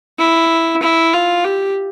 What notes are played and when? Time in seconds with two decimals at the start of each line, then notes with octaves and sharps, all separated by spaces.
0.19 E4
0.82 E4
1.13 F4
1.44 G4